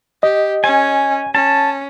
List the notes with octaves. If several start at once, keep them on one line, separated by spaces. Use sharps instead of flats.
G4 D#5
C#4 G#5
C#4 A5